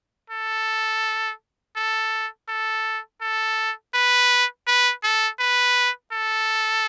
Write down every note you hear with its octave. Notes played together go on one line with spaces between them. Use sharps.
A4
A4
A4
A4
B4
B4
A4
B4
A4